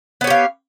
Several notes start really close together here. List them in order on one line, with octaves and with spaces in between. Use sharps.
B3 C#5 G4 F5